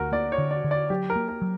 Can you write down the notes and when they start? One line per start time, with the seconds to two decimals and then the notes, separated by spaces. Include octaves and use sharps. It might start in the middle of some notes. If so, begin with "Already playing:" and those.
Already playing: D2 F#4 A#4
0.12 A#3 D5
0.32 C#5
0.38 D3
0.51 D5
0.64 D3
0.71 D5
0.90 F#3 G4
1.10 A#4
1.16 A#3
1.28 A#4
1.42 F#3